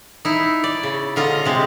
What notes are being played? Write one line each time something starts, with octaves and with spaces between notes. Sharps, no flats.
D#4 E4
D5
C#3
D3 F4 D#5 A#5
C3 G#3